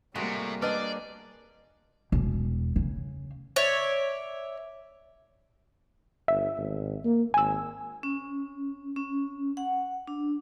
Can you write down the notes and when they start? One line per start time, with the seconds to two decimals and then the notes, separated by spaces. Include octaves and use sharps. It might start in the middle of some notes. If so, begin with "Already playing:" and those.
0.15 A2 C3 G3 G#3 A#3 F#4
0.62 D4 G#4 B4 C5 D5 D#5
2.12 E1
2.76 C#3
3.56 C#5 D5 E5
6.28 G1 E5
6.57 G#1
7.04 A#3
7.34 G#1 G#5 E6
8.03 C#4
8.96 C#4
9.57 F#5
10.08 D4